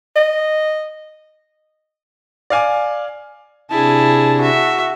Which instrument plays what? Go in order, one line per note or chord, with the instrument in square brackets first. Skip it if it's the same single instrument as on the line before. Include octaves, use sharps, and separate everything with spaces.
[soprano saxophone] D#5
[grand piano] D5 F5 G#5 D6
[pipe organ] C3 D4 [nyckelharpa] E4 G#4 [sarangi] A5
[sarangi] F#4 [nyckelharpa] E5